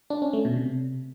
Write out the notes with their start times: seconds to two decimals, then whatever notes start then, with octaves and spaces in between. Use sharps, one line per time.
0.10 D4
0.22 C#4
0.33 A3
0.45 B2
0.56 C3